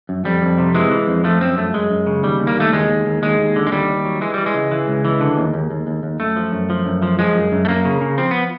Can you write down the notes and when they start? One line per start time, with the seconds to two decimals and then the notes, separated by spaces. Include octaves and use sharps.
0.09 F#2
0.25 F2 G3
0.42 F2
0.58 C3
0.75 E3 G#3
0.92 E3
1.07 F2
1.24 F3 A3
1.40 F#2 C4
1.57 F#2 A3
1.74 F#2 G#3
1.91 F#2
2.07 C#3
2.23 D#2 G3
2.40 D#2
2.47 A#3
2.56 D#2 A3
2.73 D#2 G#3
2.89 D#2
3.06 D#2
3.22 D#2 G#3
3.39 D#2
3.56 D3
3.67 G#3
3.71 D#2 G3
3.89 D#2
4.05 F#3
4.21 E3 G#3
4.34 E3 G3
4.46 G#3
4.55 C#2
4.72 E3
4.88 C#2
5.05 E3
5.21 D3
5.37 D#2
5.54 D#2
5.71 D#2
5.87 D#2
6.03 D#2
6.20 F#2 A3
6.36 F3
6.52 F#2
6.70 F3
6.86 F#2
7.02 F3
7.19 F3 G#3
7.36 F#2
7.52 F#2
7.65 A3
7.68 F#2 A#3
7.85 C#3
8.01 C#3
8.18 F3 C4
8.31 B3